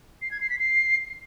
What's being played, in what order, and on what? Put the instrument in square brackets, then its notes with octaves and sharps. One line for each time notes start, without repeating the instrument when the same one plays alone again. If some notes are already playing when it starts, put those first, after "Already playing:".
[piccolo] C7
G#6
C7
B6
C7